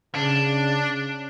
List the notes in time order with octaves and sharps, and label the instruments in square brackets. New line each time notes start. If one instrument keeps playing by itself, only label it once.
[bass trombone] C#3 [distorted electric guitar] D4